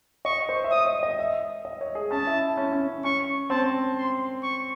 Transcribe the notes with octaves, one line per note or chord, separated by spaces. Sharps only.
D#5 C#6
C5
E5
D#5 D#6
D#5
D#5
E5
D#5
C#5
G#4
C#4 A5
E4
C#4
C#4
C#4 C#6
C4 A5
C6
C#6